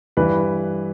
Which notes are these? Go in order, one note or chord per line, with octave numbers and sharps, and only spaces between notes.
G2 E3 B4